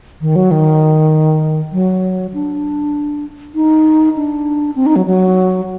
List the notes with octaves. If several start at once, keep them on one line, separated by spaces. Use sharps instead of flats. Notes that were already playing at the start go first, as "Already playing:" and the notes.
D#3
F#3
D#3
F#3
D4
D#4
D4
C4
D#4
F#3
F#3